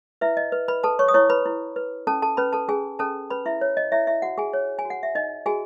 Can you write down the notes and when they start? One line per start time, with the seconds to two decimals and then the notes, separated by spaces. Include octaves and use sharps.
0.21 E4 B4 E5
0.37 D#5
0.52 B4
0.68 B4 B5
0.83 A4 B4 A5
0.99 C#5 C#6
1.08 D#6
1.14 E4 C#5 C#6
1.29 B4 B5
1.45 E4
1.76 B4
2.07 C#4 A4 A5
2.22 A4 A5
2.37 C#4 B4 B5
2.53 A4 A5
2.68 C#4 G#4 G#5
2.99 C#4 A4 A5
3.30 C#4 B4 B5
3.46 E4 E5
3.61 C#5
3.77 D#5
3.92 E4 C#5 E5
4.07 E4 E5
4.22 F#4 F#5
4.38 G#4 G#5
4.53 C#5
4.79 G#5
4.85 F#4
4.90 F#5
5.03 E5
5.15 D#4 D#5
5.46 F#4 G#4 G#5